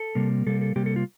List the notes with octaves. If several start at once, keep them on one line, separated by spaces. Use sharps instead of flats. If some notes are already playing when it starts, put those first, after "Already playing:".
Already playing: A4
C3 G3 A#3
C3 G3 A#3 A4
A4
C3 G3 A#3 G4
A4
F4